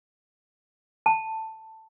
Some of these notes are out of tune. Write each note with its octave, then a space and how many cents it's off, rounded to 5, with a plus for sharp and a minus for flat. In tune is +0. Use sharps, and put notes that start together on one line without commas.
A5 +10